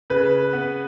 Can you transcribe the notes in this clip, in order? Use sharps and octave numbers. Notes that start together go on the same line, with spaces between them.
C#3 B4
B3